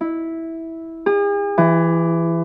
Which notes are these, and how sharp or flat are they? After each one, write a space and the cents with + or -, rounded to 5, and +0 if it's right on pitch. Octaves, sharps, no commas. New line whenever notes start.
E4 -10
G#4 -45
E3 +20